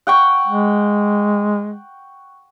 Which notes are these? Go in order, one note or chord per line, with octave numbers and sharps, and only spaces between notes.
F#5 G5 C#6
G#3